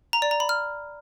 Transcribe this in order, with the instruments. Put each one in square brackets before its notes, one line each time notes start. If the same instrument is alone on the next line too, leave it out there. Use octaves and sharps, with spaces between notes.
[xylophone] A#5
D5
A#5
B5
F6